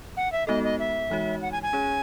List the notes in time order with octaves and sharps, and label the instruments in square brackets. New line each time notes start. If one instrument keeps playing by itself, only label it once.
[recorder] F#5
E5
[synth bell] G#3 B3 D#4 F#4 A4 [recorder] D#5
[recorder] D#5
E5
[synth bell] E3 G#3 D#4 F#4 C#5
[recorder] F#5
G#5
G#5
[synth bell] C#4 G#4 C#5